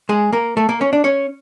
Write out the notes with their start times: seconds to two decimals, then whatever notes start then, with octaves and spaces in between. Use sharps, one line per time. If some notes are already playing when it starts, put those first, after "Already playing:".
0.09 G#3 G#4
0.32 A#3 A#4
0.57 A3 A4
0.69 A#3 A#4
0.81 C#4 C#5
0.93 D4 D5
1.04 C#4 C#5